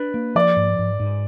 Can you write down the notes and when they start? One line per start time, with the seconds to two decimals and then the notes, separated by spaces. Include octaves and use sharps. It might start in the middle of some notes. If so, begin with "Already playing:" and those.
Already playing: D4 B4
0.14 A#3
0.35 F3 D5
0.56 G#2
0.79 G#2
1.00 G#2